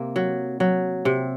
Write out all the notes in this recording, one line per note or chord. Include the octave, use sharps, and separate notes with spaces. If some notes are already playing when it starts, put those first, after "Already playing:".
Already playing: C3 A#3 C4
F#3
F#3
C3